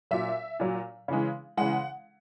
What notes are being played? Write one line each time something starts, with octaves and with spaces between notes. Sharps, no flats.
A#2 F#3 E5
A#2 F#3
C#3 E3 G#3
C#3 E3 G#3 F#5